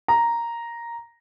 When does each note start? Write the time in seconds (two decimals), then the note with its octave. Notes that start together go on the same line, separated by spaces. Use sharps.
0.08 A#5